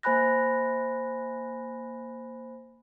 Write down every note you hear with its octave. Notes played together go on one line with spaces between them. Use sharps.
A#3 C5 G#5 B5 F#6 A#6